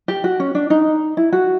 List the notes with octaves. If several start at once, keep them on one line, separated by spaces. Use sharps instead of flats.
G4
F#4
C#4
D4
D#4
E4
F#4